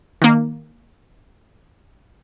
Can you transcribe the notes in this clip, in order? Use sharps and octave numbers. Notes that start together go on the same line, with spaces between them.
D#3 A#3